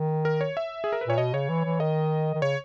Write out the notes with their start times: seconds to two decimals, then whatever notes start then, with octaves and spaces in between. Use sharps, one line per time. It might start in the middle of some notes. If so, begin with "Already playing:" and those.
Already playing: D#3
0.25 A#4
0.41 C#5
0.57 E5
0.84 G#4
0.92 A#4
1.01 B4
1.07 A#2 C#5
1.18 B2 D#5
1.33 C#3 C#5
1.49 E3
1.65 E3
1.80 D#3 D#5
2.34 D#3
2.42 C#3 C#5